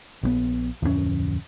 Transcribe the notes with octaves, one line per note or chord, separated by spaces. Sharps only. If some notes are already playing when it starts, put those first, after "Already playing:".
A#1 G#3 B3
D1 F2 G3 C#4